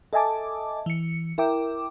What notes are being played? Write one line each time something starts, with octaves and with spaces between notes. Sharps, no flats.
A4 D#5 E5 G#5 A5 D6
E3 C#7
E4 A#4 E5 G5 D6